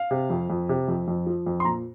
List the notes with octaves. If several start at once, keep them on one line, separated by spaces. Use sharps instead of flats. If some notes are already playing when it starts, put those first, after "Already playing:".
Already playing: F5
C3
F2
F2
C3
F2
F2
F3
F2
C6
A#2 A#5